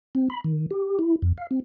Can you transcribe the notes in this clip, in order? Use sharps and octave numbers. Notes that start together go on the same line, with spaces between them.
C4
B5
D#3
G4
E4
F2
F5
C4